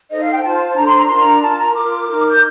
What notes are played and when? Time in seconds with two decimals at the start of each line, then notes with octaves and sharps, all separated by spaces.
0.10 D#4 A4 C5 D#5
0.21 F5
0.32 G5
0.43 F4 C5 A5
0.76 D4 A4 C5 A#5
0.86 C6
0.97 A#5
1.07 D4 F4 A#4 C6
1.18 A#5
1.42 F4 A#4 A5
1.58 A#5
1.74 F4 A#4 D6
2.08 D#4 A#4
2.30 G6